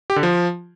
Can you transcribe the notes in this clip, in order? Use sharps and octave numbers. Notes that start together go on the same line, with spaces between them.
G4
D3
F3